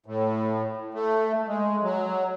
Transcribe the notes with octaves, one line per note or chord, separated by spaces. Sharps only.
A2
A3
G#3
F#3